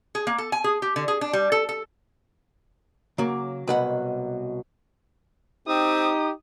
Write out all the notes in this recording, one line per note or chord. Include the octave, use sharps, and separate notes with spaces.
G#4
A#3
A4
G#5
G#4
G4
D3
G#4
D4
G3
A4
A4
C#3 F#3 A#3 D6
C2 B2 B4 F#5
C4 D#4 G4 D#6